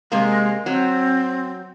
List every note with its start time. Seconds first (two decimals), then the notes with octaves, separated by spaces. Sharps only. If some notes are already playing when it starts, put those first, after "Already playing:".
0.12 C3 G#3 A#3
0.66 F#3 C4